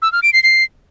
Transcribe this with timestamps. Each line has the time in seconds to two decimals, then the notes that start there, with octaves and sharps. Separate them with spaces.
0.02 E6
0.12 F6
0.23 D7
0.33 C7
0.43 C7